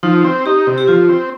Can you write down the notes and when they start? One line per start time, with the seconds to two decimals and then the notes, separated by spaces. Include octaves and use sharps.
0.03 F3 D#4
0.24 C4
0.46 D#4 G4
0.67 C3
0.78 G4
0.88 F3 F4
1.09 C4